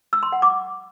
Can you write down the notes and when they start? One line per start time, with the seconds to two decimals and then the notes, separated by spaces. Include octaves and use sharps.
0.13 E6
0.23 C6
0.32 F#5
0.42 D6